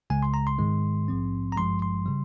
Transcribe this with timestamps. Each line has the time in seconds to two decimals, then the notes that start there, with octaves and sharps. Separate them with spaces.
0.10 C#2 C#3 G#3 G#5
0.23 C6
0.34 A#5
0.47 C6
0.58 G#2 D#3 G#3
1.08 A#1 G#2 F3 C4
1.52 A#5
1.56 G#1 G2 F3 G#3 C6
1.82 C6
2.06 C#3 G3